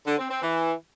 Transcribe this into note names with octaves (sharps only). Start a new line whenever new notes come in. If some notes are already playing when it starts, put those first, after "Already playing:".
D3
C4
C4
E3